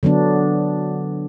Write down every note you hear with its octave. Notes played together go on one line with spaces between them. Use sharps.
D3 F#3 B3 D4